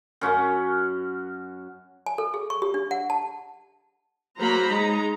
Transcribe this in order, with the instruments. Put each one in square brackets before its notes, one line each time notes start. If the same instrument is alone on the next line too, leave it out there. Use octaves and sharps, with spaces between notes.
[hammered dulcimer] F#2 C#4 F#4 F#5
[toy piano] G#5
A4
G#4
C#6
G4
D4
F#5
A5
[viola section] F#3 A#3 C5 A#5 B5
G#3 D#4 A#5